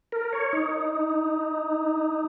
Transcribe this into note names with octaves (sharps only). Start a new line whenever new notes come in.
A#4
C#5
D#4